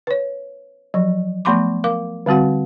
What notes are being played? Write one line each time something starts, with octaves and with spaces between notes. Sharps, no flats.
B4 C#5
F3 F#3
F3 A3 B3 B5 C6 D6
A#4 F5 D6
D3 G3 C4 F#4 F#5